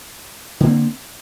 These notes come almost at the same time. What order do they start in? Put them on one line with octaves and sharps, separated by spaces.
D3 A#3 C4